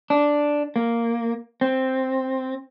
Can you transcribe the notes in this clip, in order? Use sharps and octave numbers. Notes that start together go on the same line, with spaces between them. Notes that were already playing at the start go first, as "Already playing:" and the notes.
D4
A#3
C4